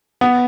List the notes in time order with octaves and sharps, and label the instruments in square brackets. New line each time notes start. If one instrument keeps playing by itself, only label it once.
[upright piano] B3